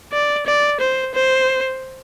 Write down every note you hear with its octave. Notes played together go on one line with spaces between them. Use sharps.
D5
D5
C5
C5